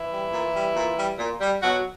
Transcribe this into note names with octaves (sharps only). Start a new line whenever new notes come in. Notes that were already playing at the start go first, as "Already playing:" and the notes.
Already playing: E3 E4
G3
A#2
G3
A#2
G3
A#2
G3
B2 F#3 F#4